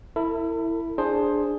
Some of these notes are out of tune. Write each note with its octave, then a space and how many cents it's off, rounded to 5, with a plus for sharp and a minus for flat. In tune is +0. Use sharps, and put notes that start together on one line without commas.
E4 +0 A4 +45
D4 +0 G#4 +0 C5 +15